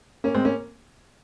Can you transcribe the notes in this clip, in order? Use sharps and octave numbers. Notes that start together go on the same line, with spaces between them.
A#3 C#4
G#3 C4
A#3 C#4